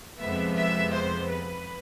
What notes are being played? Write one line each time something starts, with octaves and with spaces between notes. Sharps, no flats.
F2 C3 F3 G#3 B3 E5
E5
C5
B4